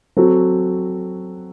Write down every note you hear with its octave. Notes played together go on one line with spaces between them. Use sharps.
F#3 C4 F#4 A4